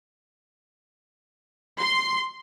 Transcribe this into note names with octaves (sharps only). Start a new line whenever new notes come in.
C6